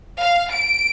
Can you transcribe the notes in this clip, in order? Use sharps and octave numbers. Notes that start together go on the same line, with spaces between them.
F5
D7